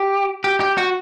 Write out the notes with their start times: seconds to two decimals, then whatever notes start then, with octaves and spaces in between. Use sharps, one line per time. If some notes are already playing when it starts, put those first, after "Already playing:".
Already playing: G4
0.44 G4
0.60 G4
0.77 F#4